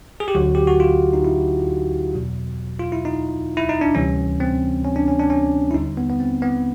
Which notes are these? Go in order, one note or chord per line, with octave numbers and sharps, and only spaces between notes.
G#4
G4
D2 D3 F#3 F#4
G4
F#4
F4
D#4
E4
E2 B2 F#3
F4
E4
D#4
E4
D#4
D4
D2 C3 E3 G3 C#4
C4
C#4
D4
C#4
D4
C#4
E4
D#2 D3 G3 D#4
B3
B3
C4
B3